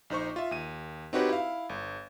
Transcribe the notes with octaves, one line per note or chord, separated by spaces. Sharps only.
A#1 D#4 C5 C#6
F4 E5
D#2 D#7
C4 D#4 F#4 G4 B4 C#5
E4 F5
G1